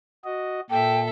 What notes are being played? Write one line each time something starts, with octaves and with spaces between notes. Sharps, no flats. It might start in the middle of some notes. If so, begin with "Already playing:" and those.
F#4 D#5
A#2 A4 E5 G5